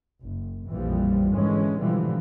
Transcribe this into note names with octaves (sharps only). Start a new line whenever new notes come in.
F#1
A#1 F2 E3 F3 G3
G#1 D3 E3 G#3 C#4
G#2 B2 D3 E3 F3 G3